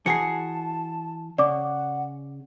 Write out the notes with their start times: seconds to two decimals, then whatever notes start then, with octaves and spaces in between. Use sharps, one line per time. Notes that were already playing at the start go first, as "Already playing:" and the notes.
0.06 E3 F#4 G#4 A5 C7 C#7
1.38 C#3 D5 F#5 D6